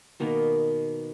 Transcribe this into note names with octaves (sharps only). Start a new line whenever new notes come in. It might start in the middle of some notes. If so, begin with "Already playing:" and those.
B2 D#3 A#3 B3